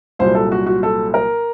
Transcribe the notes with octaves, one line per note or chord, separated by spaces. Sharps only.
C2 A#2 F#3 C5
A4
F#4
F#4
A4
A#4